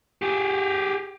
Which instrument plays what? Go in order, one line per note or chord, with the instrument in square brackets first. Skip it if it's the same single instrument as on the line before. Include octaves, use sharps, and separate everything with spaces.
[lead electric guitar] G4 G#4